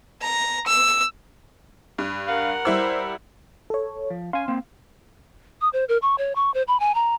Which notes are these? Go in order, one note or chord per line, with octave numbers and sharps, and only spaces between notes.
A#5
E6
G2
A#4 F5 F#5
G3 E4 C5 E6
A4 C#5
F3
C#4 F5 G#5 C6
A#3 C4
D#6
C5
A#4
C#6
C#5
C#6
C5
B5
G#5
A#5